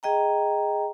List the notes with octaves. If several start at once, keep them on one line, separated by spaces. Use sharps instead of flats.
G#4 D#5 G5 A#5